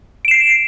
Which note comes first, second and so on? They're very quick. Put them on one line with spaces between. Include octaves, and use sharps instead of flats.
D7 E7 C7